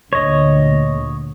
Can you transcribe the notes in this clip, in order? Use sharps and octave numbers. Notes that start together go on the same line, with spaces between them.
D2 A#2 D3 C#5 D#5